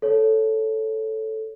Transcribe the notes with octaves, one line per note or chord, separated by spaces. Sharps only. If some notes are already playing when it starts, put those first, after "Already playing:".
A4 C#5